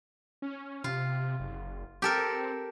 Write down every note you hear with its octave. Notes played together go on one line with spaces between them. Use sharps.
C#4
C3 F4
F#1
C4 G4 A4 A#4